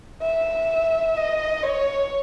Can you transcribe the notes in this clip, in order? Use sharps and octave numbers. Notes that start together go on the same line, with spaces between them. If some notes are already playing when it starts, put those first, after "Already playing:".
E5
D#5
C#5